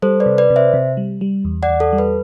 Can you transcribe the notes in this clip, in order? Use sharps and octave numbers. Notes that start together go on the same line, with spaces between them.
G3 A4 C5
B4 D5
C3
B4 D5
C3
C5 E5
C3
G3
G3
E2
D5 F#5
E2
A4
G3
B4